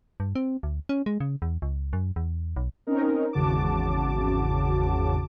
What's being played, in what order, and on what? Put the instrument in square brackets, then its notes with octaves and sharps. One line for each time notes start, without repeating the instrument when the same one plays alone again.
[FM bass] G2
C4
D2
C#4
G#3
C#3
E2
C#2
F#2
E2
B1
[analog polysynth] C4 C#4 D#4 A#4
G#1 E2 C#3 F#4 A5 D6